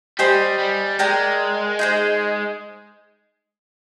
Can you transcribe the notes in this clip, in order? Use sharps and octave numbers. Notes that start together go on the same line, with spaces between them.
G3 G4 C5 D#5 G#5
G3
G#3 A#4 D5 G5 A#5
D#4 G#4 C5